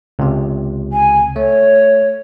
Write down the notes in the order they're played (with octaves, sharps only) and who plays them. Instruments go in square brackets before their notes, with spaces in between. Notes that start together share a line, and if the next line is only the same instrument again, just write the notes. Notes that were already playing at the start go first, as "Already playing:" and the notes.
[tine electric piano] C#2 C3
[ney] G#5
[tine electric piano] A3 [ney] C#5